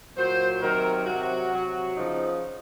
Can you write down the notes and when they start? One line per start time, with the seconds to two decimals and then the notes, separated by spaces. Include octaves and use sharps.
0.17 A#2 F#3 C5
0.62 C3 D#3 F#3 A#4
1.06 C3 F#3 F#4
1.51 C3 F#3
1.96 C#3 F3 D#4